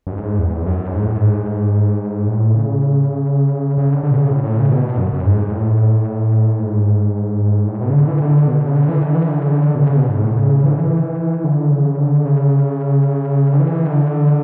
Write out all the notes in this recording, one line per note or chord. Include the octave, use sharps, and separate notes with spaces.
F#2
G#2
E2
F#2
G#2
A2
G#2
A2
C#3
C#3
D3
D3
B2
C#3
A2
A2
C#3
B2
F#2
F#2
G#2
A2
G#2
A2
B2
C#3
D3
E3
D3
B2
C#3
D3
E3
D3
E3
D3
C#3
D3
B2
C#3
B2
G#2
A2
C#3
E3
D3
E3
D3
C#3
D3
C#3
D3
E3
D3